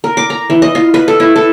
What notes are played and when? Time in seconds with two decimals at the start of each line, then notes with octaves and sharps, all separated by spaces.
0.04 A#4
0.17 D6
0.30 A#5
0.50 E3
0.62 D#5
0.75 F4
0.94 B4
1.08 A4
1.20 E4
1.36 A4